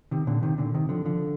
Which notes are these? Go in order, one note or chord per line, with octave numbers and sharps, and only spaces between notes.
C3 D#3
A#2 D3
C3 D#3
A#2 D3
C3 D#3
D3 F3
D3 F3